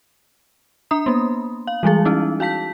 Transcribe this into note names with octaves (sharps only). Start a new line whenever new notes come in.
D4 A#5 D#6
A#3 B3
F5
E3 G3 G#3 G#4
C#4 D#4 E4
F#4 F5 A5 B6